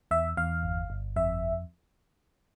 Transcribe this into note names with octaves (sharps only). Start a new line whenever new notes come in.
E2 E5
E2 F5
G1
G1
F2 E5